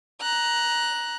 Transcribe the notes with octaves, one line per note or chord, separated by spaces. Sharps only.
A#5 F#6